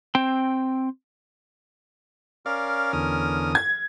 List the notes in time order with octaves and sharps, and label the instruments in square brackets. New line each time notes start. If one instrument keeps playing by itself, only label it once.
[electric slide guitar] C4 G5
[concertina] C#4 A#4 F6 [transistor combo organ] D5 F5
[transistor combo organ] E2 D3 D#6
[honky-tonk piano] G#6